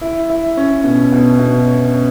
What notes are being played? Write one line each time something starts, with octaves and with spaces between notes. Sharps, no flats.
E4
E4
C#4
B2
B2
B2
C#4
C#4